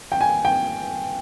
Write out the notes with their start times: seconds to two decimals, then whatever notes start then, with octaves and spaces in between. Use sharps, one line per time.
0.12 G5
0.21 G#5
0.45 G5